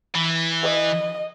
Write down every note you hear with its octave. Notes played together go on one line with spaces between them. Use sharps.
E3
D#5